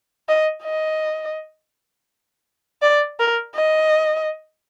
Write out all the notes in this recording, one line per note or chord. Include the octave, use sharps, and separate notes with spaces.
D#5
D#5
D5
A#4
D#5